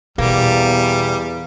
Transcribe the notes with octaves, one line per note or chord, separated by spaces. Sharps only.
E2 B2 G3 A#3